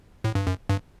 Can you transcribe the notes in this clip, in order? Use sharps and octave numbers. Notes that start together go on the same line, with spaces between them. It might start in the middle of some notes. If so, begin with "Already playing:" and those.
A2
G2
F#2
G2